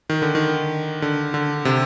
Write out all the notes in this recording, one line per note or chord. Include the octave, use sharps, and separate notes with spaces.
D#3
D3
D#3
D3
D3
C3